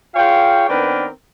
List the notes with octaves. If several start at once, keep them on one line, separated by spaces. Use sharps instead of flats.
F4 G#4 C#5 F5 G5
D#3 B3 C4 D4 A#4 B4